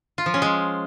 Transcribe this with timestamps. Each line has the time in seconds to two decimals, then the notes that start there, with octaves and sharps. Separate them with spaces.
0.18 F4
0.26 F3
0.34 C#4
0.42 G#3